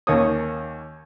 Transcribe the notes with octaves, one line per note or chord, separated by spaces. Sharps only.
D#2 A#3 C#4 C#5 D#6